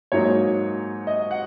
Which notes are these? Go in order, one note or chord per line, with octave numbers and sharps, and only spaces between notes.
G#2 F#3 A#3 D#4 C#5
D#5
F#5